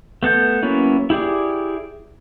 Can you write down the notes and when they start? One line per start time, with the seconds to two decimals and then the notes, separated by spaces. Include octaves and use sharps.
0.23 A3 B3 A4 G6
0.63 F#3 A#3 B3 C#4 E4
1.10 E4 G4 G#4 D5